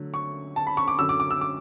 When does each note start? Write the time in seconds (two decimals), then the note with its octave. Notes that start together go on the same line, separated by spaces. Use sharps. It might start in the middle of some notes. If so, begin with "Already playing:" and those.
Already playing: D3 F#3 A3
0.14 C#6
0.56 A5
0.67 B5
0.77 C#6
0.88 D6
0.99 F#2 D3 F#3 E6
1.09 D6
1.20 D6
1.31 E6
1.41 D6